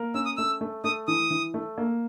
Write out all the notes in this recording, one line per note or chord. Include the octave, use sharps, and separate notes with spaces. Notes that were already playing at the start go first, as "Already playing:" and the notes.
Already playing: A#3 A#4
C#4 E6
D#6
A3 E6
A3
A3 D#6
E3 D#6
E3
A3
A#3